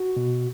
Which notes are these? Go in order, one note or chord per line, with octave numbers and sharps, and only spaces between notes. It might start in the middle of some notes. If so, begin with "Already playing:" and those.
Already playing: F#4
B2